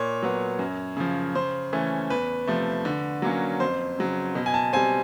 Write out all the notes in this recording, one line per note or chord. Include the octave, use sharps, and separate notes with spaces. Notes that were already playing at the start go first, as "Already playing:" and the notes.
Already playing: A#2 C#5
F#3 B3
F#2
C#3 F3
C#3 C5
E3 A3 C#4
E2 B4
C3 F3 A3
D3
F#3 A#3 C#4
F2 C5
C#3 F#3
B2
G#5
A5
G3 C4 G#5